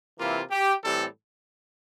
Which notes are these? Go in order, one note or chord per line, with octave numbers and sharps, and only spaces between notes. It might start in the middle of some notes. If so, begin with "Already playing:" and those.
C3 E3 A#3 E4 F4
G4
A2 E3 G3 C4 A4